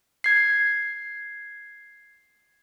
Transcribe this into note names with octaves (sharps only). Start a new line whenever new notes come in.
G#6 C7